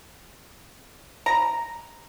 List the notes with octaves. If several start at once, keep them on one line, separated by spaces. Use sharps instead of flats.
A#5